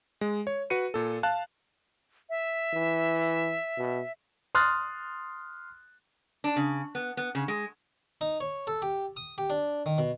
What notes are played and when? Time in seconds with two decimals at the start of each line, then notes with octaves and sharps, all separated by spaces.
0.21 G#3
0.47 C#5
0.70 F#4 B4 C#7 D#7
0.94 A#2 A4
1.23 F5 A5 F#6
2.30 E5
2.73 E3
3.78 B2
4.55 C6 D#6 F6 F#6 A6
6.44 D4
6.56 C#3
6.95 B3
7.17 B3
7.35 C#3
7.48 G#3
8.21 D#4
8.40 C#5
8.67 A4
8.82 G4
9.16 D#6
9.38 G4
9.50 D4
9.86 D#3
9.98 B2